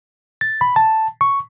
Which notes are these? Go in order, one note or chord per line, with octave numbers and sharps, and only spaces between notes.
A6
B5
A5
C#6